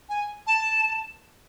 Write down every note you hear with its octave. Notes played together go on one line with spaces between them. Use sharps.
G#5
A5